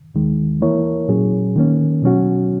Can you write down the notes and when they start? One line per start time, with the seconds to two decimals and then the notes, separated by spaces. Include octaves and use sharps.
0.15 D#2 D#3 G#3
0.61 E3 A#3 E4 A#4 C#5
1.09 A#2 F#3 C#4 G#4
1.56 D#3 A#3 C#4
2.02 B2 F#3 C#4 F#4